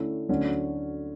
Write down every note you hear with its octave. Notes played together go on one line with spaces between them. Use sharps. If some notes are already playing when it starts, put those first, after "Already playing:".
Already playing: D3 A3 C#4 E4
D2 D3 F#3 C#4